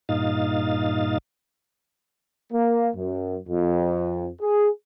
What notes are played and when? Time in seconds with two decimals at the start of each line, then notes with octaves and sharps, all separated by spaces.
0.09 G2 A#2 D#4 D#5 F5 A6
2.53 A#3
2.96 F#2
3.48 F2
4.42 G#4